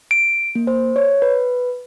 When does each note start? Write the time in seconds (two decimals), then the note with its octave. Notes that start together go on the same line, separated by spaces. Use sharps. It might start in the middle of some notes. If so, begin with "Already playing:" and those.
0.11 D7
0.55 A#3
0.67 C5
0.96 C#5
1.22 B4